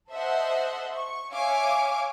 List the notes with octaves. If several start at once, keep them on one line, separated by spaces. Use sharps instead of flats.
A4 C5 D#5 E5 F#5
C#6
C#5 E5 F5 G#5 C#6 D6